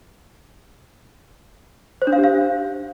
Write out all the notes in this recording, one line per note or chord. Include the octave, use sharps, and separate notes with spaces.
C5
D4
F5
G4
F5